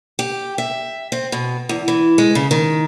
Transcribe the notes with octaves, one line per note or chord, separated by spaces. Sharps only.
G4
E5
C4
B2
E2
E3
G#3
C#3
D#3